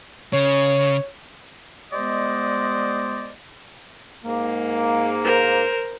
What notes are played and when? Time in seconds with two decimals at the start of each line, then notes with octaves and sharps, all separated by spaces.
0.33 C#3 C#5
1.92 G3 G#3 B3 C5 D5 D#5
4.24 G#2 A#3
5.24 A#4 C5